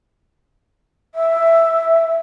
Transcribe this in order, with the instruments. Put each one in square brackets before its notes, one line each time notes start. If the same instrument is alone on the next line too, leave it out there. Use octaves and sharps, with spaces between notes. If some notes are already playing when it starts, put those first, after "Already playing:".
[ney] E5